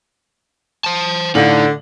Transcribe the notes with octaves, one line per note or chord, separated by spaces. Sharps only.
C5 A5
A2 D3 D#4 F5 F#7